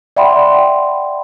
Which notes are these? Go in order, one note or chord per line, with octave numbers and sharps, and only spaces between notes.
D5 E5 F#5 G5 B5 C6